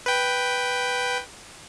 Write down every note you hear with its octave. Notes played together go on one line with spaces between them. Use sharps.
B4 G5